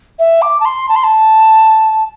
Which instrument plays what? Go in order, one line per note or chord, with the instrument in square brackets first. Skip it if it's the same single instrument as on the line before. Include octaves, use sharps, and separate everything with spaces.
[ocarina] E5
D6
A5
C6
A5
C6
A5